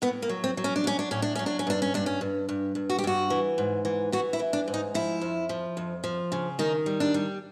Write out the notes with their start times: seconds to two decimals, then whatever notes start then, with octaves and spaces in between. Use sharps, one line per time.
0.02 A2 B3
0.22 A#3
0.29 F#3
0.44 C4
0.57 F#3
0.64 C#4
0.76 D4
0.84 F#3 C#4
0.99 D4
1.11 A2 C#4
1.22 D4
1.35 F#3 C#4
1.46 D4
1.59 C#4
1.67 G2 D4
1.82 C#4
1.94 G2 D4
2.06 C#4
2.21 G2
2.49 G2
2.75 G2
2.90 F#4
2.99 G4
3.04 G2 F#4
3.30 E3
3.58 G#2
3.85 E3
4.12 E3 F#4
4.33 E4
4.39 E3
4.53 D4
4.68 G#2
4.74 D#4
4.94 F3 E4
5.21 F2
5.49 F3
5.77 F2
6.04 F3
6.32 C#3
6.59 D#3 D#4
6.86 G3
7.00 D4
7.14 G3